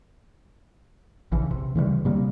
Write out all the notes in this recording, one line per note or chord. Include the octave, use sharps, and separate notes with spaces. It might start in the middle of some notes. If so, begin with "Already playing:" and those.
A#1 C#3 E3
C3
C#3 E3 F3 G3
C3 G3 A#3